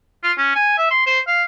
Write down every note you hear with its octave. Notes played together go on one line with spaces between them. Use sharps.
F4
C#4
G#5
E5
C6
C5
F5